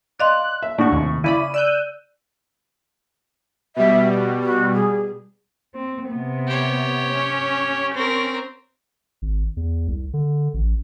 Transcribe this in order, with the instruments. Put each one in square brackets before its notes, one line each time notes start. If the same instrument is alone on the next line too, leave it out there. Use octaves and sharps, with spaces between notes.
[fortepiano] D5 [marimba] D#5 F5 C6 [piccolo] F#6
[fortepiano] E5
[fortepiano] A2 [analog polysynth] D4 F#4 [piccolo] C#6
[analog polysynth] D#2 C3
[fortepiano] C#3 [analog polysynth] E4 D5 B5 [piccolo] D#7
[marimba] D5 [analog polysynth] E6 F#6 G6
[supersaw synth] B2 G3 [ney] E5
[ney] F#4
F#4
G#4
[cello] C4
C3 B3
[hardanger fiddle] G4 C#5
[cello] C#4
[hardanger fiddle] C4 A#4
[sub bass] G#1
E2
C2
D3
A1